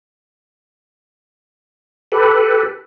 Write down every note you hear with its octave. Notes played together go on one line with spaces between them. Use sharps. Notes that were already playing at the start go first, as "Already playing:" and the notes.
G4 A4 B4